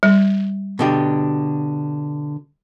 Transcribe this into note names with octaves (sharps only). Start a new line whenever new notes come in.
G3
B2 D3 G4